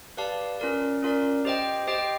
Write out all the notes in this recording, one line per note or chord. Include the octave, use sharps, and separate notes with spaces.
G4 B4 D5 F5 A5
C#4 F4 A#4 D5
C#4 F4 A#4 D5
G4 C5 D#5 G5
G4 C5 D#5 G5